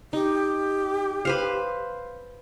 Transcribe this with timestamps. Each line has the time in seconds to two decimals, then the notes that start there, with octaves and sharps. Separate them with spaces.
0.13 D#4 G4
1.25 B4 C5 F5